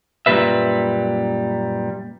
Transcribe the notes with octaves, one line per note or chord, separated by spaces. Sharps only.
F#2 A#2 C#3 G3 B4 E5